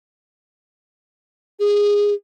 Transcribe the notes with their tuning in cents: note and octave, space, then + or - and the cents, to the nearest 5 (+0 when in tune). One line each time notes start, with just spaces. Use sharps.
G#4 -15